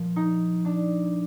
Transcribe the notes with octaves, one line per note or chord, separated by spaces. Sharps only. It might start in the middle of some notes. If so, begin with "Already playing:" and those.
Already playing: A#2 F3
D#4
D4